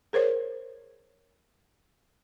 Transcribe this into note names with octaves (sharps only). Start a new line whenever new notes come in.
G#4 A#4 C5 C#5